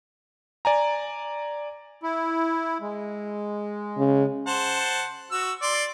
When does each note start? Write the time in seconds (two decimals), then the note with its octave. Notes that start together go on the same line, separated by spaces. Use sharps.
0.65 D5 G#5 A#5
2.03 E4
2.81 G#3
3.98 C#3
4.46 C5 F#5 A5
5.31 F#4 E6
5.62 D5 C6